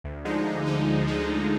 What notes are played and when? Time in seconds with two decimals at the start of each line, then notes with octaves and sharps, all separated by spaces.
0.04 D2
0.25 D3 F3 G#3 D#4
0.46 D2
0.66 D3 F3 G#3 D#4
0.87 D2
1.07 D3 F3 G#3 D#4
1.28 D2